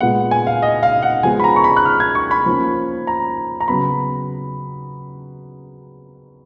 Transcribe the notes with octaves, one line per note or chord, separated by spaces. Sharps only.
A#2 G#3 B3 F#5
G#5
F5
D#5
F5
F#5
F3 G#3 B3 G#5
B5
A#5
C#6
B5
F#6
F6
G#6
C#6
B5
F3 A#3 C#4
A#5
A#5
C#3 F#3 B3 B5